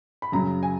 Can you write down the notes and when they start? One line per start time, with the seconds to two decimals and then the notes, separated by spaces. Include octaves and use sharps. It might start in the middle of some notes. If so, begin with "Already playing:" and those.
0.22 B5
0.32 F#2 C#3 F#3 A#5
0.63 G#5